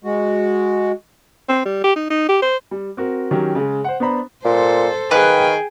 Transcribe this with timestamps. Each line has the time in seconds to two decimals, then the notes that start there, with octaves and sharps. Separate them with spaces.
0.04 G#3 F#4
1.49 C4
1.65 G3
1.84 G4
1.96 D#4
2.10 D#4
2.29 G4
2.42 C5
2.71 G3
2.97 C4 F#4 A#4
3.31 D#3 F#3 C#4 G4 A#4
3.55 C#3 G#3
3.84 C5 F#5
4.00 B3 D4 C5 A#5 B5
4.45 A#2 A4 C5
5.11 D#3 G#4 B4 F5 G5 F#6